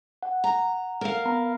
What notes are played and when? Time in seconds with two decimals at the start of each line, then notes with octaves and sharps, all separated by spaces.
0.23 F#5
0.44 A#5
1.01 A#4 F5
1.25 B3 A#5 B5